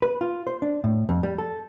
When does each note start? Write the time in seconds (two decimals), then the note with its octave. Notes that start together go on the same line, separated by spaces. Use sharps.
0.02 B4
0.21 F4
0.47 C5
0.62 D4
0.84 A2
1.09 F2
1.23 G3
1.38 A4